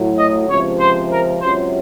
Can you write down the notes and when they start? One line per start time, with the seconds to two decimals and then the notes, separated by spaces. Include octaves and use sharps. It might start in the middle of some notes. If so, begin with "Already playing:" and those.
Already playing: A2 F#3
0.18 D#5
0.49 C#2 C3 F3 C#5
0.80 C5
1.12 A#4
1.42 C#2 C3 F#3 C5